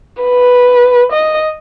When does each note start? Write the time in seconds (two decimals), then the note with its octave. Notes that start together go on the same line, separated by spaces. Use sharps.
0.23 B4
1.12 D#5